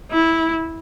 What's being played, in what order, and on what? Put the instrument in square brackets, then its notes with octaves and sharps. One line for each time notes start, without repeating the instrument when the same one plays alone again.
[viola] E4